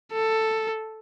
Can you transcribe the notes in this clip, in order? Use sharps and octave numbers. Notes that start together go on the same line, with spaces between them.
A4